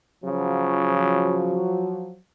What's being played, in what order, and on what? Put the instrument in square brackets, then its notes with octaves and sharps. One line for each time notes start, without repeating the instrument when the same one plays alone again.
[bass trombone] C#3 [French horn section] F3 F#3